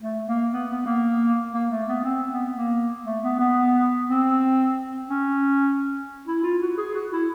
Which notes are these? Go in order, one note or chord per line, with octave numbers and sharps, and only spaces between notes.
A3
A#3
B3
B3
A#3
A#3
A3
B3
C4
B3
A#3
A3
B3
B3
C4
C#4
E4
F4
F#4
G#4
F#4
E4